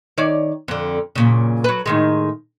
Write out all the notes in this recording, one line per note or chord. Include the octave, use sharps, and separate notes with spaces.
D#3 C#5 D5
F2 D3
F#2 A#2 C#3
F#3 B4
A2 D#3 G#3